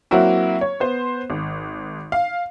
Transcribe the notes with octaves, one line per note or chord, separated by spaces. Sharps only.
F#3 A#3 C4 E4 F#4
C#5
B3 C5
G#1
F5